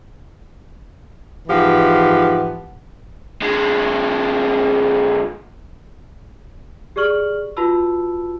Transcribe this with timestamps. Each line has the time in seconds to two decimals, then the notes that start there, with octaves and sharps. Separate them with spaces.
1.48 G#2 E3 F3 B3 G4
3.42 D3 G#3
6.96 G4 G#4 D5 C#6 F6 F#7
7.57 F4 F#4 B4 A5 B5 E6